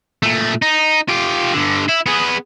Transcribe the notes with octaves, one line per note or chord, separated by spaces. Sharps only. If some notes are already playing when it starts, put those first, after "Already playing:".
A#2 A3
D#4
F4 G4
G2 D3
E4
B3 G#4